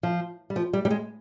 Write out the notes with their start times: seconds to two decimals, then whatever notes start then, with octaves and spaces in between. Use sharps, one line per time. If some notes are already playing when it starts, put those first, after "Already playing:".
0.03 F3
0.50 G3
0.56 F3
0.73 G3
0.85 G3
0.90 G#3